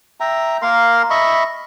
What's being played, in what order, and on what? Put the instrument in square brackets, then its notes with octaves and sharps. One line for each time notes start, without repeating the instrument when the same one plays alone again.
[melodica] E5 G5 A#5
A#3 A#4 F5 C6
D#5 E5 B5 C#6